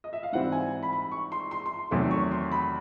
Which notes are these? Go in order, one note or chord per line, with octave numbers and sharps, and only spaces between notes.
D#5
E5
F5
G#2 E3 G3 C4 E4 F#5
G#5
B5
B5
C#6
C6
C6
C6
C6
E2 C3 D#3 F#3 A3 C6
C#6
C6
B5